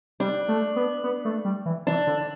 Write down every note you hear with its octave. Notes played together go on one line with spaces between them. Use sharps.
G3 D4
A3
B3
B3
A3
G3
E3
E3 D4
D3